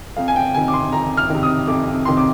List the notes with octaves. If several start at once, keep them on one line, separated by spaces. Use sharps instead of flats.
F2 F5
G#5
G5
C3 D#3 G#5
D6
C6
F2 A#5
F6
C3 D#3
D#6
F2 D6
C3 D#3 C6
D6